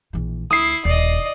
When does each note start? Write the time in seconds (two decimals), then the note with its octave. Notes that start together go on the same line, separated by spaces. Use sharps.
0.13 A#1 E3
0.51 D2 E4 D#6 C7
0.85 D#1 D5 D#5